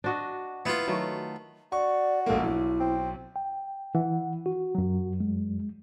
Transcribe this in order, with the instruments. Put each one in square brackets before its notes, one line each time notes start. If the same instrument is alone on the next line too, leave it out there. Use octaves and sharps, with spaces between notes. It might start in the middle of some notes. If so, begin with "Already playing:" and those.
[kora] D4 F#4 D#5
[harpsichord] B3 F4 [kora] E4 B4
[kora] D#3 F#3 A3
[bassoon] F#4 [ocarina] D5 [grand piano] C#6
[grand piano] A#1 G#2 A#3 [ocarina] A4
[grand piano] B1 [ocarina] E4
[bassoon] C4
[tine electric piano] G5
[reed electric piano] E3 [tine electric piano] F#5
[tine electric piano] F#4
[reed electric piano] F#2 F#3
[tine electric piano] G#3